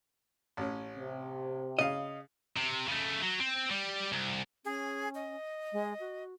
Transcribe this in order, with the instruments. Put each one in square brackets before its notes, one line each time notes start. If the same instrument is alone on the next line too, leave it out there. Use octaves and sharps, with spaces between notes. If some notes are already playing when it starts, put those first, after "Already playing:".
[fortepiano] A1 C#4
[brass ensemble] C3
[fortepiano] C#3 F5 [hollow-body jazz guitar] D#5
[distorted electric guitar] C3
C#3 A3
F#3
C4
G3
C2
[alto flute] C#4 [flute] G#4
[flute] D#5
[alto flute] G#3
F#4